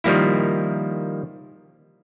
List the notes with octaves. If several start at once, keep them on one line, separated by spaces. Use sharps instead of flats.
D#3 F3 G3 A#3 E4